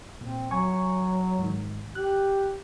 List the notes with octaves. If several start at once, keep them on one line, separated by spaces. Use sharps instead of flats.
A#2 C4
F#3 G#5 C#6
G#2 D#3
G4 F#6